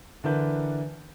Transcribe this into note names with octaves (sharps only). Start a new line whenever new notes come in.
D3 E3 D4 A#4 B4 G6